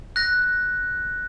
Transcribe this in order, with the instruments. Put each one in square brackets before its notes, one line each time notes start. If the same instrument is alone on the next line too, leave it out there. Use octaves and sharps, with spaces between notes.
[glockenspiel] F#6 A#6